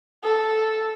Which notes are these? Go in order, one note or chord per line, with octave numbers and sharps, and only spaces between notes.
A4